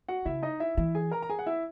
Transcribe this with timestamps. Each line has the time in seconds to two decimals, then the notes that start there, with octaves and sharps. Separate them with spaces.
0.09 F#4 F#5
0.25 C#3 E4 E5
0.43 D#4 D#5
0.60 E4 E5
0.77 E3 E4 E5
0.95 G#4 G#5
1.11 A#4 A#5
1.22 A#5
1.30 G#4 G#5
1.39 F#5
1.46 E4 E5